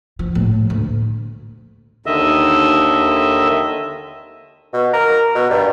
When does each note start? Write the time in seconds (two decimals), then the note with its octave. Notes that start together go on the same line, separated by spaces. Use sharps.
0.19 F3
0.35 A2
0.70 D2
2.06 D#2 D3 D#3 D#5 E5
4.73 B2
4.93 A#4
5.35 B2
5.50 G2